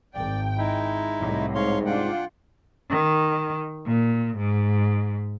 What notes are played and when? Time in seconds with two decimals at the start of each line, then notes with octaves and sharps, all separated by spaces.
0.15 G#1 D5 G5
0.57 G#3 D#4 E4
1.19 C2 A2
1.55 G#2 C#5 F5 C6
1.86 D4 F4 F#5 G5
2.90 D#3
3.86 A#2
4.37 G#2